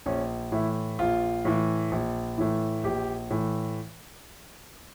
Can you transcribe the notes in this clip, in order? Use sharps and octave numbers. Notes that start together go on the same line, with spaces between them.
A#1 C#4
A2 E3 E4
A#1 F4
A2 E3
A#1
A2 E3
A#1 G4
A2 E3